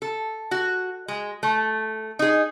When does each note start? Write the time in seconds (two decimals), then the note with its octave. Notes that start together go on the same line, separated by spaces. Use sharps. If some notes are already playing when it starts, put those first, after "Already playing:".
0.02 A4
0.51 F#4
1.08 G#3
1.43 A3
2.19 D#4 G#4